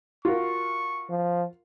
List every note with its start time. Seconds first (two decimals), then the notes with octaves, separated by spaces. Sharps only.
0.25 F4 F#4 A#4 C#6
1.10 F3